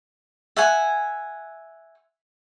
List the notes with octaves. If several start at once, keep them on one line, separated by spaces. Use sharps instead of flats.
E5 F#5 G#5